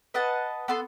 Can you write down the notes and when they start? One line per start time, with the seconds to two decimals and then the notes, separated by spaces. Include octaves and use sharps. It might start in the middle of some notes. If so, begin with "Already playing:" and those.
0.14 B4 D#5 F#5 A5
0.68 B3 A4 C6